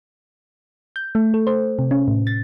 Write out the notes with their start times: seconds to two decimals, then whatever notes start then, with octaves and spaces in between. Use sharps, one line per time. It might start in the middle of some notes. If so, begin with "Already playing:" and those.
0.96 G6
1.15 A3
1.34 A4
1.47 C5
1.79 C3
1.91 C#4
2.08 A2
2.27 A6